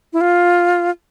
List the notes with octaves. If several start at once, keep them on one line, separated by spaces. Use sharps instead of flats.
E4
F4